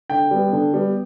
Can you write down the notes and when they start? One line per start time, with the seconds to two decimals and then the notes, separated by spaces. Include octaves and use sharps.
0.10 D3 G5
0.31 G3 B3
0.52 D3
0.74 G3 B3